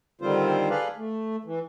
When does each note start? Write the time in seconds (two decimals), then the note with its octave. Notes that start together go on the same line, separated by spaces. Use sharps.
0.21 D3 D#3 G3 C4 F4 C5
0.70 G#4 A4 B4 D5 F5
0.97 A3
1.44 E3